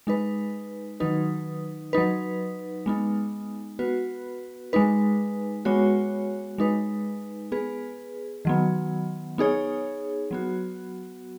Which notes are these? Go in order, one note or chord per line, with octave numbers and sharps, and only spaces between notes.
G#3 D#4 B4
D#3 F#3 D#4 B4
F#3 D#4 B4
G#3 B3 D#4
B3 F#4 B4
G#3 D#4 B4
G#3 B3 F#4 C#5
G#3 D#4 B4
B3 G#4 B4
D#3 F#3 B3
B3 D#4 G#4 C#5
F#3 B3 F#4